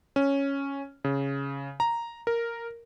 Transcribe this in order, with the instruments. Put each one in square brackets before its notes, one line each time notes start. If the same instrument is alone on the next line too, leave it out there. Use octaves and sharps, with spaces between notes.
[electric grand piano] C#4
C#3
A#5
A#4